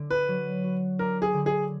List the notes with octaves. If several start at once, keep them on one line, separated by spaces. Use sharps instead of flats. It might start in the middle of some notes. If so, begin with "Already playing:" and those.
Already playing: D3 D4
B4
F#3
F#4
D4 A#4
G#4
D3
G#4